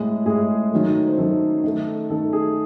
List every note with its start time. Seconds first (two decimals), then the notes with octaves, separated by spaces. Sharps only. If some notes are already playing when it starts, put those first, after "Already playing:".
Already playing: A2 G#3 G#4
0.26 A2 G#3 G#4
0.72 D#3 F#3 A3
1.07 C5
1.18 D#3 F#3 A3 A4
1.64 D#3 A3
2.10 D#3 A3 A4
2.33 G#4